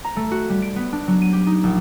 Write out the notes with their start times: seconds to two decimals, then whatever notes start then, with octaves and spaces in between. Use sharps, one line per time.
0.04 A#5
0.17 A3
0.32 F#4
0.50 G3
0.62 D7
0.76 B3
0.93 D4
1.08 F#3
1.22 D#7
1.33 G4
1.47 D#4
1.64 A#1